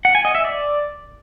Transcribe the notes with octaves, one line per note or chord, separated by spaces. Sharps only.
F#5
G#5
D#5
E5
D5